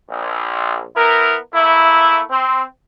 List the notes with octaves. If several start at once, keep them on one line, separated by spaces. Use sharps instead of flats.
A#1
B3 E4 A#4
A3 A#3 E4
C4